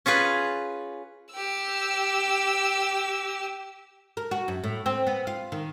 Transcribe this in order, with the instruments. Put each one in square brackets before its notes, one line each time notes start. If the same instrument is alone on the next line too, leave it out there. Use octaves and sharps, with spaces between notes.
[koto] C#4 F4 G#4 B4
[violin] G4 E6
[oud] A#4
F#4
F#2
A2
C4
B3
F4
D#3